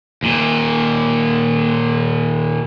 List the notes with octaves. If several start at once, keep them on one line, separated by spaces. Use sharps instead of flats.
D#2 A#2